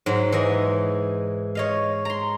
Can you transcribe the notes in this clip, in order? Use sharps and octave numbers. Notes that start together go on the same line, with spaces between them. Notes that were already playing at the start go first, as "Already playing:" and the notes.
G#2 F#3
E3 G#4 D#5
C#5 D#5 F5
A#5 C6